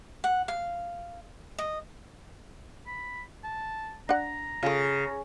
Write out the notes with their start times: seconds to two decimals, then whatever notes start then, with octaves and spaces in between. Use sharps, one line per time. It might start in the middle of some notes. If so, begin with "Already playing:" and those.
0.24 F#5
0.48 F5
1.58 D#5
2.87 B5
3.44 A5
4.09 D4 F#5 A#5
4.63 C#3 F4 A4